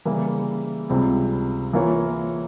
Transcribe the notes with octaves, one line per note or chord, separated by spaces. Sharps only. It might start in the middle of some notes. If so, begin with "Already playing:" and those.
C#3 E3 G3 A#3 E4
C#2 C3 G3 C4
E3 A#3 F4 A#4 C#5